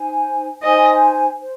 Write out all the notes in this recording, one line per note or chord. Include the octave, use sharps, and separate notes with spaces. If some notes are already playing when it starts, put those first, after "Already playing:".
Already playing: D#4 C5 G#5
D#4 C5 D#5 G#5
C5